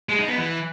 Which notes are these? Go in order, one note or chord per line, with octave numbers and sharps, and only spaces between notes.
G#3
D#4
B3
E3